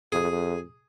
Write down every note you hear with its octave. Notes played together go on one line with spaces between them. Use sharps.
F2 G#4